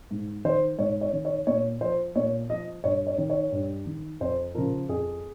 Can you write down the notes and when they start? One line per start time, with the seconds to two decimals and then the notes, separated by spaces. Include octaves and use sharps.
0.11 G#2
0.45 D#3 C5
0.79 G#2 C#5
1.01 C#5
1.13 D#3
1.25 C#5
1.47 A#2 C#5
1.81 F3 C5
2.16 A#2 C#5
2.49 F3 D#5
2.84 G2 C#5
3.07 C#5
3.18 D#3
3.30 C#5
3.52 G2
3.86 D#3
4.20 F2 C5
4.55 C#3 F3 A#4
4.89 F2 G#4